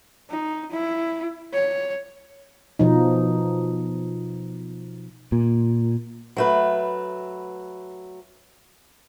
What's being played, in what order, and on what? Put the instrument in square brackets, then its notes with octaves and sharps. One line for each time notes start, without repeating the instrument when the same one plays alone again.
[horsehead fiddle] D#4
E4
C#5
[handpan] B2 F3 D#4
[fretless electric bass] A#2
[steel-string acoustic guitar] F#3 A3 B4